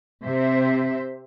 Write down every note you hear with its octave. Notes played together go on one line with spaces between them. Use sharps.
C3 C5 E5